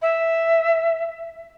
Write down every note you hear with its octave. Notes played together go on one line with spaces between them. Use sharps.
E5